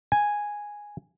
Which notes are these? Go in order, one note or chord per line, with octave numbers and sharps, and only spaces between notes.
G#5